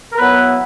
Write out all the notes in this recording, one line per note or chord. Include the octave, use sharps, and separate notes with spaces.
A#4
F#3 B3 E4 B4